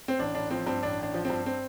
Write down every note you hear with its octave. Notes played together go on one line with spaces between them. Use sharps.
C4
A1 D4
A1 D4
F3 C4
G2 C4
A1 D4
A1 D4
F3
C4
G2
C4